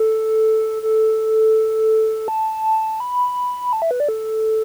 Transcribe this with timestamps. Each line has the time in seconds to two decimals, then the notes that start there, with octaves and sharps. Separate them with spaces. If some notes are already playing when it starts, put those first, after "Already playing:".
Already playing: A4
0.83 A4
2.28 A5
3.00 B5
3.73 A5
3.82 E5
3.91 B4
4.00 D5
4.09 A4